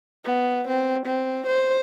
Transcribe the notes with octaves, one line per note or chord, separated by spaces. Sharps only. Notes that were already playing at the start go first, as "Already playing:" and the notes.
B3
C4
C4
C5